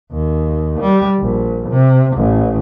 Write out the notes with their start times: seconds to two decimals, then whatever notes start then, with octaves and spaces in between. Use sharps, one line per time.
0.11 D#2
0.80 G3
1.20 A#1
1.70 C3
2.18 A1